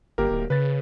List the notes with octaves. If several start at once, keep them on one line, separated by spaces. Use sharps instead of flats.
G1 A#3 G4 A#4
D1
C#3 B4 A6